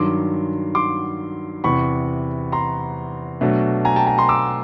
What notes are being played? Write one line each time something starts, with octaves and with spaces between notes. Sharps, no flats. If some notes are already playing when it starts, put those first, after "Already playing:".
Already playing: G2 D#3 F#3 C6 D6
C6 D6
E2 C3 E3 B5 C#6
A#5 C6
B2 F#3 A3 D4
G#5 A#5
G5 A5
G#5 A#5
A#5 C6
D6 E6